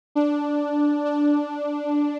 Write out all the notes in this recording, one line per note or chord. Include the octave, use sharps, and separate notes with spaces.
D4
D4